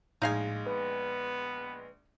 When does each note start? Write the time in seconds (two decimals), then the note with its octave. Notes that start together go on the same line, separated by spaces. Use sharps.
0.22 A#1 A2 G#3 D#4 F5 G#5
0.67 B3 B4